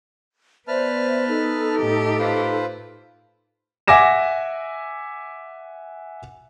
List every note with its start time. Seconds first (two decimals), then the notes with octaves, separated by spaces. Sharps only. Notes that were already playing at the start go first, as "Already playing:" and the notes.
0.68 B3 B4 C5 D5 E5 A5 F6
1.28 D#4 A4
1.76 A2 G4
2.19 F4 B4 C5
3.88 E5 F#5 G#5 D6 A#6 E7